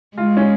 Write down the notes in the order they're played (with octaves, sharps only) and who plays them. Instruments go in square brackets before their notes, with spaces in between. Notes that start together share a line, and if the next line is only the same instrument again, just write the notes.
[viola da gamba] G#3 [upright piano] F4
[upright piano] C#4